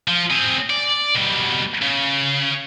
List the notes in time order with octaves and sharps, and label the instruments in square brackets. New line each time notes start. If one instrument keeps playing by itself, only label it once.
[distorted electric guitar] F3
C4 G#4
D5
B2 G3
C#3